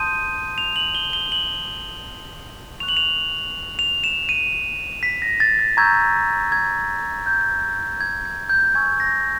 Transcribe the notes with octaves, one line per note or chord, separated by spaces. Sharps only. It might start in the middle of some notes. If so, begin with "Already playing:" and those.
Already playing: A5 C6 D#6 G6 D#7
F7
F#7
G7
G7
F#7
C#6 F#6 F7
F#7
F7
F7
E7
D#7
B6
A#6
A6
A6
A#5 C#6 E6 G6 G#6
G#6
G6
G#6
G#6
G6
G#5 C#6 E6 G#6
A#6